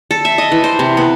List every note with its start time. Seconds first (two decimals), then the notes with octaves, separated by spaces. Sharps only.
0.11 A4
0.25 E5
0.38 D#5
0.52 E3
0.64 C5
0.79 C3
0.97 B3